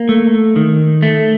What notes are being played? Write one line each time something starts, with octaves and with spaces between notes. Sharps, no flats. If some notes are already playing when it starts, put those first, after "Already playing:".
Already playing: A#3
A3
D#3
A3